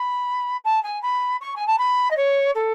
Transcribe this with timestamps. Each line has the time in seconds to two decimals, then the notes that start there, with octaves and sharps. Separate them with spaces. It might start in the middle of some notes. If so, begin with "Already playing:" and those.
Already playing: B5
0.64 A5
0.83 G#5
1.02 B5
1.41 C#6
1.56 G#5
1.67 A5
1.78 B5
2.10 D#5
2.17 C#5
2.54 A4